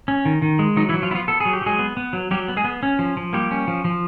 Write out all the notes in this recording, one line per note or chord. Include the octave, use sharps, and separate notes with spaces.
C#4
D#3
D#3
G#3
D#3 F#3 D#4
E3 E4
F#3
F3 F4
F3 B3 E4 F4
B3 A4
F#3 G#4
G4
F#3 G#3 G#4
B3
B3
F#3
F#3 G3 G4
B3
G#3 G#4
B3
C#4
F3
F3
G3 A#3 G4
C#4
F3
F3